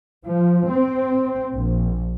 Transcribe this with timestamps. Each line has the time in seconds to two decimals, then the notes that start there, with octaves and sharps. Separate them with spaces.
0.24 F3
0.68 C4
1.54 A#1